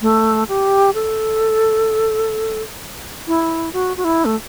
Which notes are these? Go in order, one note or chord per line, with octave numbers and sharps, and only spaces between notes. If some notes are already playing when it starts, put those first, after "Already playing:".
A3
G4
A4
E4
F#4
F#4
E4
A3